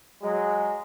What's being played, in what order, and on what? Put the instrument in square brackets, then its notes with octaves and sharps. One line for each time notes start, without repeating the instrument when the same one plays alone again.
[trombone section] F#3 G#3